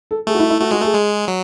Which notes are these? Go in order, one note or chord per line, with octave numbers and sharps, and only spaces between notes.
A4
A3 G#4
F#4
E4
E4
A3 F#4
G#3 F#4
A3 G#4
G#3
F#3